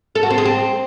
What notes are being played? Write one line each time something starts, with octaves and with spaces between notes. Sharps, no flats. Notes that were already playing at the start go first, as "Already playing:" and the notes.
A4
F#4
C4
G#4
C4